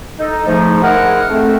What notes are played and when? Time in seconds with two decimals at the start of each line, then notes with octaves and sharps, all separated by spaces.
0.19 D#4 A4
0.46 G#2 F3 A3 D#4
0.82 G#3 E4 A#4 C5 F#5
1.30 A3 C4